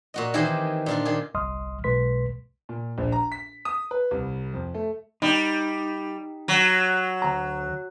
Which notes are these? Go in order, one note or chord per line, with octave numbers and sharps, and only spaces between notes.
A#2 F#4 D#5
D#3 E3 C4 G4 G#4 D#5
A#2 D4 F4
D#3 G#4
G1 C2 D#5 C6 D#6 F6
B1 B2 G#3 B4 C6 B6
A#2
A#1
A#5
B6
D#6
B4
C2
F2
A3
G3 D#4
F#3
D2 A#5